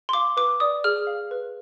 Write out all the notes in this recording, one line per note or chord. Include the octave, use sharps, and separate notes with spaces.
C6
F5 D6
B4 D6
D5 D#6
G#4 F6
F5
B4